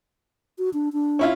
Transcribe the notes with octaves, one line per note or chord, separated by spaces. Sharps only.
F#4
D4
D4
C#4 E4 F4